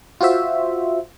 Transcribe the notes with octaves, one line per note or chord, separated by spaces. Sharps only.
F4 F#4 C5 E5